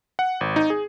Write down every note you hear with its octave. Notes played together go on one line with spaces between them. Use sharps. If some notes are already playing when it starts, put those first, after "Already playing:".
F#5
G#1
D#4
G#4